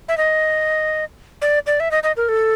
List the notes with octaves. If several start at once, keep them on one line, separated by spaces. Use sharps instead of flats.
E5
D#5
D5
D5
E5
D#5
D#5
A#4
A4